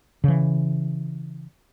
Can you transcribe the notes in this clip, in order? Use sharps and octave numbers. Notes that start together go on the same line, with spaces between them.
C#3 E3